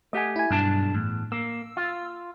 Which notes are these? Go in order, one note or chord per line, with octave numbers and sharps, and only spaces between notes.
A3 G4 D#5 F#5 G#5
E4 G#5
B1 G2 D4 A5
E2 A2
A#3 E6
F4